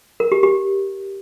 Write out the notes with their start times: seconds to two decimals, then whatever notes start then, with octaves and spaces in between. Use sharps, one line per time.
0.20 A#4
0.32 G4
0.43 G4